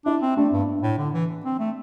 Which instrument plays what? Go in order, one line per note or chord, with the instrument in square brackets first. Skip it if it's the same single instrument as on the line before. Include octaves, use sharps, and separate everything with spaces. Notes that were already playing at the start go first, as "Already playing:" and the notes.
[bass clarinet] D4 [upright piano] E4
[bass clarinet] C4
[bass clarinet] A3 [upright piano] D4
[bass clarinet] G2
A2
D3
E3
C4
A3